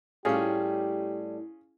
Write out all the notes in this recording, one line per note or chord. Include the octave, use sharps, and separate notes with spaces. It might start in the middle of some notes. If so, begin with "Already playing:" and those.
A2 G3 C#4 F4 G4 G#4